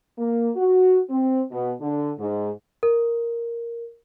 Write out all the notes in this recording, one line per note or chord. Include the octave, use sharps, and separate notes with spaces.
A#3
F#4
C4
B2
D3
G#2
A#4